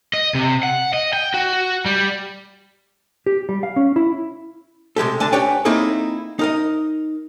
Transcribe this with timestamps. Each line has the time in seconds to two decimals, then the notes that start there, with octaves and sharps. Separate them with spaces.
0.14 D#5
0.35 C3
0.63 F#5
0.93 D#5
1.13 G5
1.34 F#4
1.86 G3
3.26 G4
3.49 G3
3.63 F5
3.76 C#4
3.96 E4
4.96 C3 G#3 G4 A4
5.20 D3 G#5 A5
5.32 D4 G4 B4 C#5 G5 G#5
5.65 A#3 C4 D#4 E4 G#4 A4
6.39 D#4 A#4 D#5